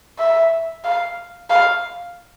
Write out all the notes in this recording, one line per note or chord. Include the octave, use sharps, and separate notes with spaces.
E5
F5
F5